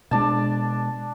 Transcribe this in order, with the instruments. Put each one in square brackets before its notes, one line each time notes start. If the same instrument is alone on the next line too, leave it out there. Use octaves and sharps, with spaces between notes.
[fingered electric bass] B2 G#3 [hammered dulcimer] D4 A5